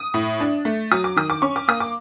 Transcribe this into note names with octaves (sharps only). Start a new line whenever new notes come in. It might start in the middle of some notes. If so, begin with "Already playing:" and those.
Already playing: D#6
A2
D4
A3
F#3 D#6
D6
D#3 D#6
D6
C#4 C#6
D6
A#3 D#6
D6